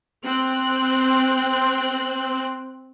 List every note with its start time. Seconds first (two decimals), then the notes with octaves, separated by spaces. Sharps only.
0.24 C4 F#6